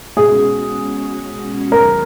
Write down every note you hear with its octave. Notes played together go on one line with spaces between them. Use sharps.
B2 G#3 C#4 F#4 G#4
D#2 D#3 F#3 B3 A#4